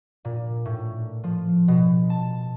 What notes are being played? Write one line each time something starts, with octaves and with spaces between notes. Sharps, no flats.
A#2
A2
F3
B2
A5